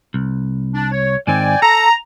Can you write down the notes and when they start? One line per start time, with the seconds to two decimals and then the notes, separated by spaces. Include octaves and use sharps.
0.14 C2
0.74 D4
0.92 C#5
1.27 G#2 D#3 C4 D5 G5 G#5
1.62 A4 A#5